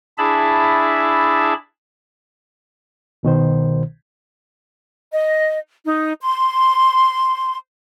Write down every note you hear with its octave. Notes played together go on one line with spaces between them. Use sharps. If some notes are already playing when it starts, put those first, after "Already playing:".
D4 E4 G#4 E5 A5 B5
C2 B2 D#3 C5
D#5
D#4
C6